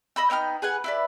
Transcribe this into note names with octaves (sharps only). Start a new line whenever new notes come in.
D#5 B5 E6
B3 D#4 G5 F6
G#4 B4 F#5 G#5
E4 B4 D5